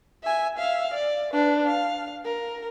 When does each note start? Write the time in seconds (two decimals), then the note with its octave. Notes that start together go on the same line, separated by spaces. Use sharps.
0.24 E5 G#5
0.58 E5 F5
0.94 D5
1.33 D4 B4
1.67 F5
2.25 A#4